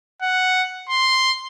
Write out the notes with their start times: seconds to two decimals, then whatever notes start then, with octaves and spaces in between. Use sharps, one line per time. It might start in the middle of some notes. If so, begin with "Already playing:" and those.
0.22 F#5
0.89 C6